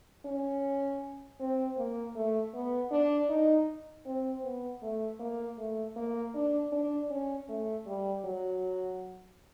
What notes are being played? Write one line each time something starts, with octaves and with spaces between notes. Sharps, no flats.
C#4
C4
A#3
A3
B3
D4
D#4
C4
B3
A3
A#3
A3
A#3
D4
D4
C#4
A3
G3
F#3